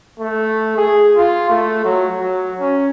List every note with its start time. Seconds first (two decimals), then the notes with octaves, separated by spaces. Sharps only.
0.19 A3
0.77 G#4
1.17 F4
1.49 A3
1.84 F#3
2.20 F#3
2.60 C#4